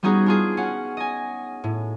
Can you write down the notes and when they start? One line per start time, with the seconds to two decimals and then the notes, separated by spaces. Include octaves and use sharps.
0.03 G3 B3 C#4 D#4 F#4 G#4
0.26 D4 F4 G#4
0.57 C#4 F#5
0.97 D#5 G#5
1.64 A2